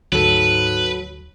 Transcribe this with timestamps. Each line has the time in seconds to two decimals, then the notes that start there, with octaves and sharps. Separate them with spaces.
0.12 D2 G#2 F#3 A4 B4